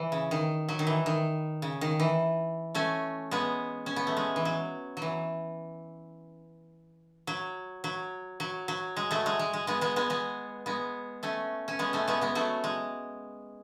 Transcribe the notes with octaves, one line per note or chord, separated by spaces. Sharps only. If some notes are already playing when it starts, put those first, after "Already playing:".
Already playing: E3
C#3
D#3
F#3
D#3
E3
D#3
C#3
D#3
E3
A3 C#4
G#3 B3
C#4
B3
A3
G#3
E3
F#3
F#3
E3
F#3
F#3
F#3
F#3
G#3
F#3 A3
G#3
G#3
G#3
G#3 B3
G#3 B3
G#3 B3
G#3 B3
G#3 B3
A3 C#4
C#4
G#3 B3
A3 C#4
G#3 B3
G#3 B3
F#3 A3
G#3